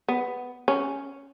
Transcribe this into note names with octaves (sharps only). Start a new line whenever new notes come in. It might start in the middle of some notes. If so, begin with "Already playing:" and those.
B3
C#4